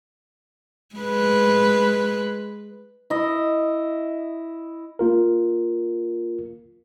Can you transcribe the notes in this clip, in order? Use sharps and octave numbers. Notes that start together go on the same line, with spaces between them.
G#3 B4
E4 D#5
A#3 F4 A#4